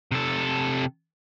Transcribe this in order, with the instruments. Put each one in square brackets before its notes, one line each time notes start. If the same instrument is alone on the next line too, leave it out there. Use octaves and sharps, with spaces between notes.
[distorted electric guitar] C3 A4